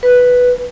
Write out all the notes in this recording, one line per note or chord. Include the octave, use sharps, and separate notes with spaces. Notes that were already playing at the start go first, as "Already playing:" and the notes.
B4